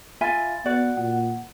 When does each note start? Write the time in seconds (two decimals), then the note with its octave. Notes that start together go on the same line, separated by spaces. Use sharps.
0.21 F4 E5 G#5 B5 A6
0.66 B3 F#4 D5
0.97 A#2 F#5